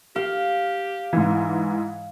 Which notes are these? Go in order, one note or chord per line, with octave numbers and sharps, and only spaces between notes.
G4 F5
G#2 E3